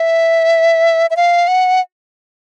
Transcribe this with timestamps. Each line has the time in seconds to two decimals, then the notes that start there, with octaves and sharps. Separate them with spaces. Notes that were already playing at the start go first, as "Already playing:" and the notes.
Already playing: E5
1.10 E5
1.17 F5
1.48 F#5